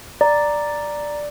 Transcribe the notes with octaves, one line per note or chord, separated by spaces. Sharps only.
D5 A#5